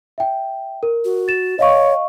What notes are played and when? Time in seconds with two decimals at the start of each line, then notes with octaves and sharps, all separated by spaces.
0.18 E5 G5
0.83 A#4
1.05 F#4
1.28 A6 E7
1.59 C#5 D#5 F5 C#6